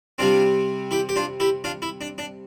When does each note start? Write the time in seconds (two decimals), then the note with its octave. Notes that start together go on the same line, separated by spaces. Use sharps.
0.18 C3 G3 C4 D4 F4
0.91 E4 G4
1.09 G4
1.16 D4 F4
1.40 E4 G4
1.64 D4 F4
1.82 E4
2.01 D4
2.18 D4